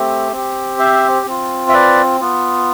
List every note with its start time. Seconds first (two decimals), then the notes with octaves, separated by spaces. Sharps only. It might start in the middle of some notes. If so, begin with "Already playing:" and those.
Already playing: A3 C4 G4
0.32 C4 G4
0.79 C5 E5
1.26 C4 F4
1.69 E5
1.74 B4 D5
2.21 B3 F4